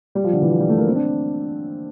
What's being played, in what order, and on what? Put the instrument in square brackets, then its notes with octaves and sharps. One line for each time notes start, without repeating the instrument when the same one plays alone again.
[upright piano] G3
F3
D3
E3
F3
G3
A3
A#3
C4
D4